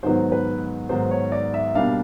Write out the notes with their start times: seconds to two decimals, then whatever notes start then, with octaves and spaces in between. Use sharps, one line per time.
0.03 G#2 D#3 F#3 B3 C5
0.32 B4
0.89 G#2 D#3 F#3 B3 C5
1.11 C#5
1.32 D5
1.54 E5
1.75 B2 G3 A#3 D4 F5